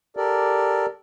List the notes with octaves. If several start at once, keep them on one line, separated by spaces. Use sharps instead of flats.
G4 A4 A#4 D5